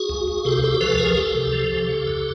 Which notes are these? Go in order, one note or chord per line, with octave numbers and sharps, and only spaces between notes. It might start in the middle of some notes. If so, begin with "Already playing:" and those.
Already playing: F#4 G#4
C#2
C#2
C3 G4 A4
C#2 G4 A4
F3 A4 B4
C#2 G#4 A#4
C#2 G4 A4
C3
F3
C#2
C#3
F#2